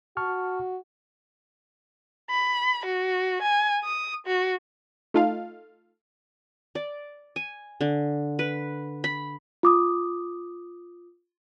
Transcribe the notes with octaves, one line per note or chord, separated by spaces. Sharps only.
F#4 A5 C#6 F6
B5
F#4
G#5
D#6
F#4
A3 D#4 F4 A4 F5
D5
G#5
D3
B4
B5
F4 D6 D#6